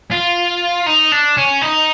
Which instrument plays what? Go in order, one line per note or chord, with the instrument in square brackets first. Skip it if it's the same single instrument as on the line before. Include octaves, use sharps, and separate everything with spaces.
[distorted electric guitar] F4
D#4
D4
C#4
D#4